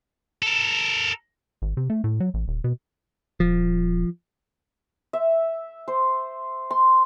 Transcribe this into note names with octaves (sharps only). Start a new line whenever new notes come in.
A4 A#4
G#1
C3
A3
A2
F#3
A1
D#1
B2
D#1 F3
E5
C5
C6